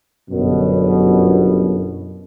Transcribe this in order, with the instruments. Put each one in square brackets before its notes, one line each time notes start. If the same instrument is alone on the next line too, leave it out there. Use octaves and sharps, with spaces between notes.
[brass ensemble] G1 F#2 B2